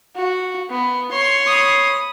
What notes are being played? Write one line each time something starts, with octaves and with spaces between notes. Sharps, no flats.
F#4
B3
C#5 C6
B5 D#6